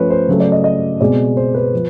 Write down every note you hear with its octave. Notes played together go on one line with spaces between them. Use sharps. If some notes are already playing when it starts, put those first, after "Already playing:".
Already playing: F3 A3 C#4 B4 C#5
C5
C#3 F#3 A3
D5
D#5
D#5
B2 G#3 C4 D5
C5
B4
F3